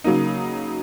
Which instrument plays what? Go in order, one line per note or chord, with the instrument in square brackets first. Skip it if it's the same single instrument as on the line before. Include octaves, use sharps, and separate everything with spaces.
[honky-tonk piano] C#3 F#3 A#3 D#4